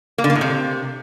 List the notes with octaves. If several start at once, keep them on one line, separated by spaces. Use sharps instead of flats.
A#3
D3
A#3
A2
C3